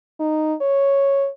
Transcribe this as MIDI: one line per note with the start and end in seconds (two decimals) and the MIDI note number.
0.20 0.54 63
0.61 1.29 73